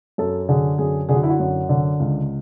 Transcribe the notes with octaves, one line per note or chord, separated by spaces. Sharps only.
F#2 A4
D3 G#4
F#2 G#4
D3 G#4
F#4
E4
F#4
F#2
D3
C#2